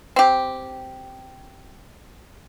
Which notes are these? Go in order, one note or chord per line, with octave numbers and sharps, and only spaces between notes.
C4 G4